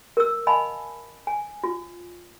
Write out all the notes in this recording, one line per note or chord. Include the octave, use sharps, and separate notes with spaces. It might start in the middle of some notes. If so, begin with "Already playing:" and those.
A#4 E6
D#5 F5 G#5 A5 B5
G#5
F4